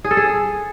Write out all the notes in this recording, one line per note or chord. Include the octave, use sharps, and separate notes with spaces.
G#4
A4
G#4